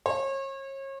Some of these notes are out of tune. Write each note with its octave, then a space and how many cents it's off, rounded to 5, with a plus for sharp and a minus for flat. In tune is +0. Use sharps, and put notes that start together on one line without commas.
C#5 -35